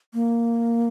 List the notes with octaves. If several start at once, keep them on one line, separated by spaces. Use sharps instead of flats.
A#3